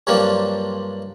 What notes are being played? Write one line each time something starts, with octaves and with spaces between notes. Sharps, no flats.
G2 F3 F#3 A#3 C4 D4